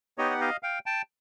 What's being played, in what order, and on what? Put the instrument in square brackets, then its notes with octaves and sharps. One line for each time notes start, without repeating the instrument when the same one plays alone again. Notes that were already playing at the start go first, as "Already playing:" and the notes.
[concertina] B3 D#4 G4 C#5 D#5
F#5
D#5 F5
F5 G5
G5 A5